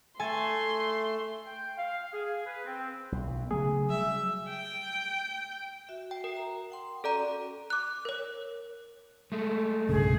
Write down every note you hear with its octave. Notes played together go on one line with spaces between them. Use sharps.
A3 A4 G#5 C6
G5
F5
G#4
B4
C4
B1
C#3 F#3 A3 G#4
F#3 G3 E5
G5
F#4 E5
G5
A#4
A#5
F#5 G5 C6
C#4 F#4 A4 D5 A#5
D6 F#6
A#4 C#5
G#3 A3
B1 G2 C#3 G#4